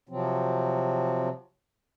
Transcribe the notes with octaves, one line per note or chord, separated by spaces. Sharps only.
C3 F3 F#3 C4